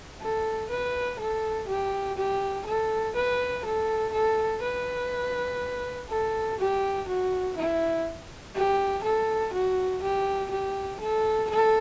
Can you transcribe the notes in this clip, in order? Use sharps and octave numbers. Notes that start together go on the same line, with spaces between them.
A4
B4
A4
G4
G4
A4
B4
A4
A4
B4
A4
G4
F#4
E4
G4
A4
F#4
G4
G4
A4
A4